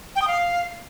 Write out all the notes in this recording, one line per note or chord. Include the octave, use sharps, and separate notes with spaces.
G5
D#6
F5